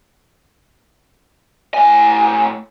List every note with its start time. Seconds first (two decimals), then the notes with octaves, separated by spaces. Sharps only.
1.74 A2 G#5